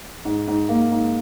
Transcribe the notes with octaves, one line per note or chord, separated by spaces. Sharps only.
G#2
G#2
A#3
G#2